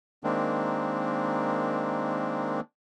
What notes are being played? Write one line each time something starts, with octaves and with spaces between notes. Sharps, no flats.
D#3 G#3 A#3 C4 D4